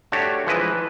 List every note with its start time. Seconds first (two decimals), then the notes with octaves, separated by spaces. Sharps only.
0.12 A3 D4 F#4 G4 C#5
0.47 E3 F3 G#3 E4 B4 D#5